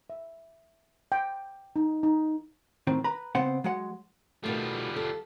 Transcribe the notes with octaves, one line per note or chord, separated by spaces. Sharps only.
E5
G5
D#4
D#4
A2 D#3 C4
B4 A#5 B5
C#3 B3 C4 C5 F#5
F#3 G#3 F#5
B2 D#3 G3 A3 F4
A4